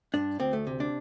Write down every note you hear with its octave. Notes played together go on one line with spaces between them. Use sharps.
G2 D4
D2 C4
A3
C3
D4